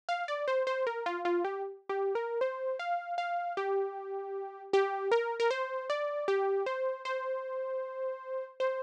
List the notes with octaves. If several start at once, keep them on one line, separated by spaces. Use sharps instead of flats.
F5
D5
C5
C5
A#4
F4
F4
G4
G4
A#4
C5
F5
F5
G4
G4
A#4
A#4
C5
D5
G4
C5
C5
C5